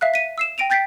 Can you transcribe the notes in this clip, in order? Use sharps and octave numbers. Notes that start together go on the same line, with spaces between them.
E5 F5 F#6
B6 D#7
E6 C7 E7
G5 A#6 D7 D#7 F7
G5 G6 A6 B6 C7 D7